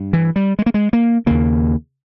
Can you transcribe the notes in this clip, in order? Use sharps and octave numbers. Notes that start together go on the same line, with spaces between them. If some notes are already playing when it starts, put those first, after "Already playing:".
Already playing: G2
E3
G3
G#3
A#3
G#3
A#3
D#2 C#3 A#3